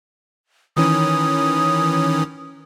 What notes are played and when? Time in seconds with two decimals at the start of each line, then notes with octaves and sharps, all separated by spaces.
0.77 D#3 E3 C#4 D#6